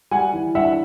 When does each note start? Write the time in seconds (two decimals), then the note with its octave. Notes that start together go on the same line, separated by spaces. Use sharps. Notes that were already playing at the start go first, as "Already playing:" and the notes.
0.11 G3 F#5 G#5
0.33 E3
0.55 G2 E5 F#5